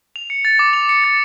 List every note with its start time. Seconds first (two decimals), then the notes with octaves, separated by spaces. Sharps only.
0.16 F7
0.30 C#7
0.45 A6
0.59 D6
0.73 F7
0.89 C#7
1.04 A6